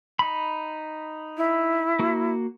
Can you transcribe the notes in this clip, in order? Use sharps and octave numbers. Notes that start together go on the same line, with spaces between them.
D#4 B5
E4
A#3 F#4